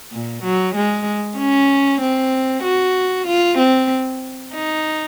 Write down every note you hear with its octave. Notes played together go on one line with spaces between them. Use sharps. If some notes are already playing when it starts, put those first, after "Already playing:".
A#2
F#3
G#3
C#4
C4
F#4
F4
C4
D#4